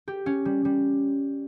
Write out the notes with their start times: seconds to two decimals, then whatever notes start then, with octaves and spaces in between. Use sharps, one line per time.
0.08 G4
0.26 C#4
0.45 G3
0.65 G3